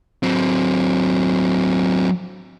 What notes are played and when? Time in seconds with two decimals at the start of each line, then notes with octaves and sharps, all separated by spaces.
0.23 F#3 C4